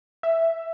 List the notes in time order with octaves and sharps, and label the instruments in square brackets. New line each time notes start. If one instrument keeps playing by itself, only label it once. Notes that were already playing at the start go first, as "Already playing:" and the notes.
[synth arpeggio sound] E5